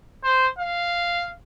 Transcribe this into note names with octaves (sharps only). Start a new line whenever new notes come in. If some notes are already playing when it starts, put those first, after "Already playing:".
C5
F5